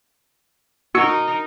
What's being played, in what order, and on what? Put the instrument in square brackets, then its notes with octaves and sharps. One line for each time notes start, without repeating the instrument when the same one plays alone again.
[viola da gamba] D#4 A#4 [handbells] F#4 E6 C#7